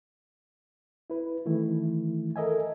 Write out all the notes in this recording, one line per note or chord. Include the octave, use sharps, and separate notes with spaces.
E4 B4
D#3 E3 A3 E4
A4 A#4 D#5 E5 G#5